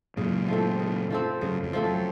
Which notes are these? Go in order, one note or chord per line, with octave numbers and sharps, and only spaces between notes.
F#2 A#2 C#3
F3 A3 C4
C#3
F3 A3 C4
F#2 C#3
F2
F3 A3 C4
F#2